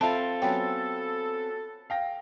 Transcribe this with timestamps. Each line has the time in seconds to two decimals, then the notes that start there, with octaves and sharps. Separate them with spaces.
0.01 C4 F4 A4 E5 A5 B5
0.42 F#3 B3 C#4 G5
1.90 F5 G5 A#6